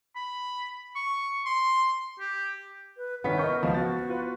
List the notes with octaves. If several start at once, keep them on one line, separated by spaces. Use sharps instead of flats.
B5
C#6
C6
G4
B4
C2 D#3 B3 C#4 B6
A#4 D#5 C#6 G6
C#2 F3 F5
F#4 A6
F4 B4